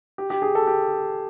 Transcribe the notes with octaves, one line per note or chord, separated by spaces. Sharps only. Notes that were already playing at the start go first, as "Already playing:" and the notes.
G4
G4
G#4
A4
G4